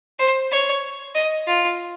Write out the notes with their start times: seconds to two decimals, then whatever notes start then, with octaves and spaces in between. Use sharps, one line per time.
0.19 C5
0.51 C#5
1.15 D#5
1.47 F4